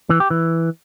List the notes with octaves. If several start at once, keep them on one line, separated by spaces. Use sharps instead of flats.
E3
G4
E3